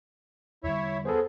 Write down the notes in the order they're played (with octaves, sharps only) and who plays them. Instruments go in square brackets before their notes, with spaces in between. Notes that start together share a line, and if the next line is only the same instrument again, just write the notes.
[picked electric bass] E2 D3 G3 [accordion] E4 C#5 E5
[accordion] B3 G#4 [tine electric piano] A4 C5